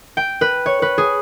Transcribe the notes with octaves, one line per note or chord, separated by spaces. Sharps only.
G5
B4
C#5
B4
G#4